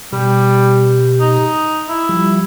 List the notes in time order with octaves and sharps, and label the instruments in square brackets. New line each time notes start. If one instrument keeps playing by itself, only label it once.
[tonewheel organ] B2 G4 [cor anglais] G3
[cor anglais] D#4
E4
[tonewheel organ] F3 G3